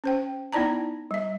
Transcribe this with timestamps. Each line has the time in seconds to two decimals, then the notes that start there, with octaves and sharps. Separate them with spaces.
0.04 C#4 C5 G5
0.53 B3 D#4 E4 D5 A5 A#5
1.11 G3 E5